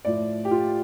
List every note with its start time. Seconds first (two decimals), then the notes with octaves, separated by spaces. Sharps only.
0.05 A2 F3 D5
0.45 G4
0.51 F4